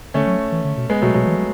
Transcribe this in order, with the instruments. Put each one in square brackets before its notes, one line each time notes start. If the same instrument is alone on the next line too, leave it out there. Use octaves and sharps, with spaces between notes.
[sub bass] D3 [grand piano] A3 C#4
[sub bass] F#3
E3
D3
B2
[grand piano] G#3 B3
[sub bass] B2 [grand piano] F#3 A3
[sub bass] B2 [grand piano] F#3
[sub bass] E3
F#3